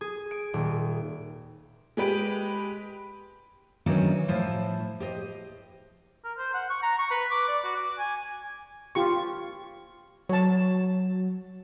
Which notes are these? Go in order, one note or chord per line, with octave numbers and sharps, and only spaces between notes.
G#4
D7
D#1
G#3 G4 B4 D7
D#3 E3 F#3 B3 C#4 D4
A2 F3 E4 C5
G4 C5 D#5
A#4
C5
F#5
C#6
A#5
C#6
B4
D6
D5
F#4
D6
G#5
F4 G4 C#6
F#3 C#5 A5